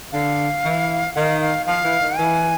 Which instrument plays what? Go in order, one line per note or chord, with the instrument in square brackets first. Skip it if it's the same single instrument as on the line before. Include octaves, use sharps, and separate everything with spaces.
[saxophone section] D3 [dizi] F5
[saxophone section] E3
[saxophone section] D#3 [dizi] F5 F#5
[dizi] F5
[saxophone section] F3 [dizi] F5
[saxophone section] E3
D#3
[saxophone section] E3 [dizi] G#5